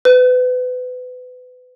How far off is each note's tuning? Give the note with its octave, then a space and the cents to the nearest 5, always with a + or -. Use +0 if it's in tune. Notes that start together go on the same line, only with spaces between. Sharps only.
B4 +30